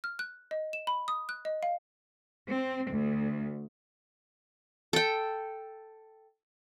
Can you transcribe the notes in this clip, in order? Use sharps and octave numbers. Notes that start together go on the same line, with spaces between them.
F6
F#6
D#5
E7
B5
D#6
F#6
D#5
F5
C4
D2
A4 G5